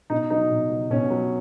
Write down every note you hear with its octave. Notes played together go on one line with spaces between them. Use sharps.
B2 D#4
F#3 D#4
B2
F#3
B2 C#4
F#3